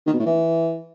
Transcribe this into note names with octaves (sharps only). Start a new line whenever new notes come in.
D#3
B2
A2
E3